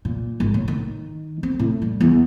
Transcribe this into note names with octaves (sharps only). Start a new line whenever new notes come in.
A#2
G#1
A2
D#3
C4
A2
G3
E2